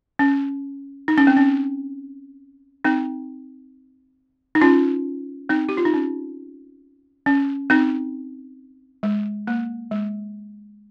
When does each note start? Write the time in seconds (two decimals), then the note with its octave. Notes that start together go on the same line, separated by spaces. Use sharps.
0.19 C#4
1.08 D#4
1.18 C#4
1.27 C4
1.37 C#4
2.84 C4 D#4
4.55 D#4
4.61 C#4 F4
5.49 C4 D#4
5.69 G4
5.77 F4
5.85 D#4
5.94 C#4
7.26 C#4
7.70 C4 D#4
9.03 G#3
9.47 A#3
9.91 G#3